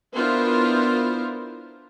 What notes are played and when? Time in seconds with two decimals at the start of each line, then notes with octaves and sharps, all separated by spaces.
0.14 B3 D4 E4 F4 A#4 C5